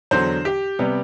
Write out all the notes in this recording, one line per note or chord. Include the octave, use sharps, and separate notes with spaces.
E2 D3 F#3 C5
G4
C3 G3 B3